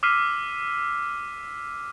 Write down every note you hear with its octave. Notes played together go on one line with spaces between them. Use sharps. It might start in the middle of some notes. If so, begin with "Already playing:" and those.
D6 E6 F6 B6 C7 D#7